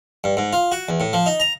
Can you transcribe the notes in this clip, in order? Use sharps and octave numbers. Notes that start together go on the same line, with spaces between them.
G2
G#2
F4
F#4
E2
A2
F3
D#4
A#5